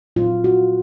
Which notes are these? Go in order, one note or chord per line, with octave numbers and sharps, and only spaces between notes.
A#2 F#3 C4 F4
F#4